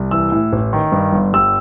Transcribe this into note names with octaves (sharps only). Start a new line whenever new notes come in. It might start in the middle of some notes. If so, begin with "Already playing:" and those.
Already playing: C2
E3 E6
A2
A1
D#3
G2
G1
G3 E6